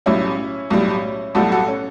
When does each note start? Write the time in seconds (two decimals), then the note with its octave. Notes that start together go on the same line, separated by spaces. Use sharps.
0.06 B1 A2 G3 C#4 E4
0.70 B1 A2 G3
1.35 B1 A2 G3 F#4 A4
1.52 F#4 A4
1.68 C#4